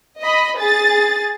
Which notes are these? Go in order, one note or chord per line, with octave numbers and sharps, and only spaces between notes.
D#5 B5
G#4 A6